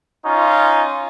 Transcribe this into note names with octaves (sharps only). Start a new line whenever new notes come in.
C#4 D#4 F4